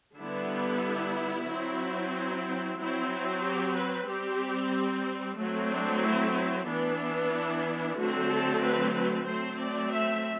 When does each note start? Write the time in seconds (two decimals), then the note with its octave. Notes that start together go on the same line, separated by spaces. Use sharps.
0.18 D3 G3 B3 E4
1.48 F#3 C4
2.78 F#3 C4 E4
3.11 E4
3.43 G4
3.76 B4
4.08 G3 C4 G4
5.38 F#3 A3 C4
5.71 D4
6.03 E4
6.35 E4
6.68 E3 B3 D4
7.33 E4
7.98 D3 F#3 A3 C4 F#4
8.30 A4
8.63 B4
8.95 B4
9.28 F#3 A3 C4 C5
9.61 D5
9.93 E5